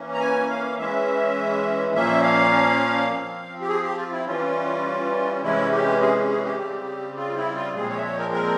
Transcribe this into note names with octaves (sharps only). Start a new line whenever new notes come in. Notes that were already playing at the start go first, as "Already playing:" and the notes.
Already playing: E3 A#3 C#4
A#5
G#5
F5
E3 G#3 C#4 E5
A#2 F3 A#3 C#4 E5
F5
F3 C4
G4
G#4
G4
F4
E4
E3 G3 C#4 F4
C3 E3 G#3 C#4 E4
G4
G#4
G#4
G4
C#3 G3 C4
F4
E4
F4
A#2 F3 G#3 C4 G#4
C#5
E5
C#5
A#4
A#4